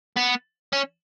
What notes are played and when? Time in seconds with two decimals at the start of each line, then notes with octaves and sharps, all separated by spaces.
0.16 B3
0.73 C#4